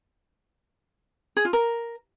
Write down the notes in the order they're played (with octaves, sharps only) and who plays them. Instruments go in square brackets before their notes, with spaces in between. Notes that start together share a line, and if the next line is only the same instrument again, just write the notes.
[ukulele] G#4
F4
A#4